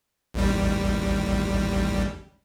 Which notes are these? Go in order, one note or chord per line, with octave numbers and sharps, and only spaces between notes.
A1 D#2 G3